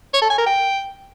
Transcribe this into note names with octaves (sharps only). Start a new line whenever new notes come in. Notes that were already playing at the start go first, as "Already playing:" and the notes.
C#5
A4
G#5
A#4
G5